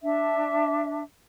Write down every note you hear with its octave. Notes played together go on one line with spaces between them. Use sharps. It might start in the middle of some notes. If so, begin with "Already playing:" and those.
D4 E5